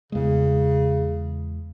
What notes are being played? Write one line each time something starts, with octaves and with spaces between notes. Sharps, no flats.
E2 C#3 G#3